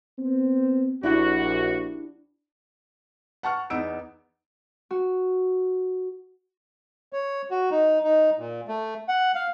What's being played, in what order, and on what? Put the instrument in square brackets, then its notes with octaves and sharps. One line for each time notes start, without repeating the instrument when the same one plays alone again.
[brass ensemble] B3 C4
[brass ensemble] A#1 [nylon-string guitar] D4 E4 G4 [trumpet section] F#4
[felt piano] F#5 A5 C#6 F6
E2 B3 D#4 E6 D7
[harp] F#4
[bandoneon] C#5
F#4
D#4
D#4
A#2
A3
F#5
F5